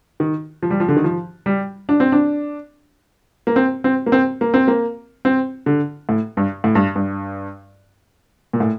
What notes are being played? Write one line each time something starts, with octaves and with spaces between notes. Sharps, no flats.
D#3
F3
G3
F3
D3
D#3
F3
G3
D4
C4
D4
A#3
C4
C4
A#3
C4
A#3
C4
A#3
C4
D3
A2
G2
A2
G2
G2
A#2
A2